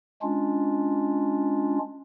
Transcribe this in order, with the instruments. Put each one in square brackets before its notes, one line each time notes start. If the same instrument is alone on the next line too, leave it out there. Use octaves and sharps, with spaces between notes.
[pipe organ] G#3 C#4 D4 F4